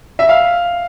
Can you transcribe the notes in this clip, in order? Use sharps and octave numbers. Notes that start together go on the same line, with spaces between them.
E5
F5